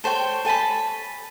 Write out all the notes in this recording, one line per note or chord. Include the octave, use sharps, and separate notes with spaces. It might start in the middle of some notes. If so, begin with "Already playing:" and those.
A4 C5 C#5 G5
A4 G#5 A5 B5